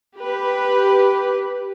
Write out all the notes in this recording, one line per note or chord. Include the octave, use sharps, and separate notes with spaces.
G4 B4